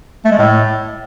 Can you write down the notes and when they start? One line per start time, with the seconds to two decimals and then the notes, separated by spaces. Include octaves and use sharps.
0.25 A3
0.31 G#3
0.38 A2